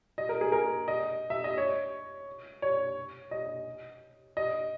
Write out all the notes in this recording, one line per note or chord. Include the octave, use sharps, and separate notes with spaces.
D#5
A#4
G#4
A#4
D#5
E5
D#5
C#5
C#5
D#5
D#5